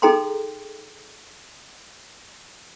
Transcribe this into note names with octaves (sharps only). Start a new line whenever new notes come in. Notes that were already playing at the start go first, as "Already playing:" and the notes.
D#4 G#4 A4 G5 A#5 C6